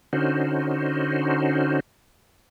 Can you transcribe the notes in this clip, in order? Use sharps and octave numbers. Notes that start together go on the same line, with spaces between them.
D3 C#4 D#4 F#4 C5